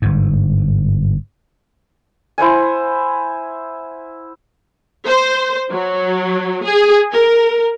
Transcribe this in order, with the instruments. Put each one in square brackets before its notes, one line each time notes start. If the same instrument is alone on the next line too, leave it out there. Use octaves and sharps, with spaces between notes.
[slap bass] G1 G#2
[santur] E4 C5 F#5 G#5
[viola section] C5
F#3
G#4
A#4